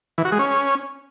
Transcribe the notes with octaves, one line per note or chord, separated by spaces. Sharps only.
E3
F#4
G#3
C#4